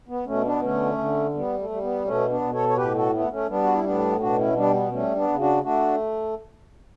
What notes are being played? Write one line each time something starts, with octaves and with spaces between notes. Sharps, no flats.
B3
B2 A3 C#4
B3 D4
D3 A3 C#4
D3
G3 B3
A3
G3
B3
B2 A3 C#4
B3 D4
B2
A4 C#5
C#5
A2 G4 B4
F#4 A4
A3 B3
A3 C#4
G3 B3 D4
F#4
E4
A2 B3 D4
B2 D4 F#4
C#4 E4
G3 B3 D4
B3
G3 A3 C#4
B3 D4
C#3
D4 F#4
A3 D4 F#4